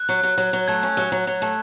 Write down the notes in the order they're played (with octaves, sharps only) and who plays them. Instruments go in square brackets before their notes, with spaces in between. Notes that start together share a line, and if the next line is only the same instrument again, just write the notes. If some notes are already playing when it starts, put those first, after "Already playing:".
Already playing: [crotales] F#6
[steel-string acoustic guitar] F#3
F#3
F#3
F#3
[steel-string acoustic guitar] A3 [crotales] G#6
[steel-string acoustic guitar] C#4
F#3
F#3
F#3
A3